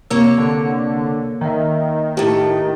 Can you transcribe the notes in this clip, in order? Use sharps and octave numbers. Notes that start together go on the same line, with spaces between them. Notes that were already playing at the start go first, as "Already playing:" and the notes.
C3 A#3 C#5 E6
D3
D#3 A#4 D#5 E5
A2 A3 G4